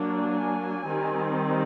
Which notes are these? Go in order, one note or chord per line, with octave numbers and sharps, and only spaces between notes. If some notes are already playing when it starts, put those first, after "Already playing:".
Already playing: F#3 A#3 D4
G#5
D#3 G3 C4